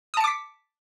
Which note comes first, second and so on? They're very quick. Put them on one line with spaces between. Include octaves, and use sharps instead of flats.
D#6 A5 C#7 D6 B6